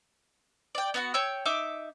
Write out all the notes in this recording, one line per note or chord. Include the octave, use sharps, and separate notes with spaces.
D5 G5
B3 F#4 F#5
C#5 G5 E6
D#4 E5 D6